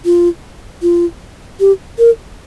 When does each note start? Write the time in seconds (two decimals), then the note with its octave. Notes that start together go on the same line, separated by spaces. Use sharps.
0.05 F4
0.82 F4
1.60 G4
1.98 A#4